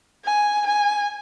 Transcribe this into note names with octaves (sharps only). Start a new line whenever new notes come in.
G#5
G#5